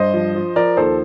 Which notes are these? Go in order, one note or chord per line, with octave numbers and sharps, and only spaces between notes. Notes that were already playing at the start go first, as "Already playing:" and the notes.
Already playing: G2 C5 D#5
F3
F3
F3 A#4 D5
D#2 A4 C5